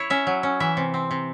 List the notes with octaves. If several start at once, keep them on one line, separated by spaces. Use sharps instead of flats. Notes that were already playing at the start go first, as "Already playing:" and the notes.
Already playing: E4 C#5
C#4 E5
F#3
C#4
E3 E5
C3
C4
C3